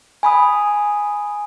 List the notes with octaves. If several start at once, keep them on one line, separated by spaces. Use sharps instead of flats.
G#5 B5 D#6